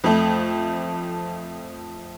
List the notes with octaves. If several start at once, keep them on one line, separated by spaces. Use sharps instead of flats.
F2 F3 A3